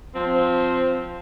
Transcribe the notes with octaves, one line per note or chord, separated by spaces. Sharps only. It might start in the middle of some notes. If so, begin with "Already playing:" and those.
F3 C4